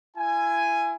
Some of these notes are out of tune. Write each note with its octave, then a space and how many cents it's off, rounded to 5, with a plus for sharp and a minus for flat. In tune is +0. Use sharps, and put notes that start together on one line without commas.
E4 +40 G#5 +0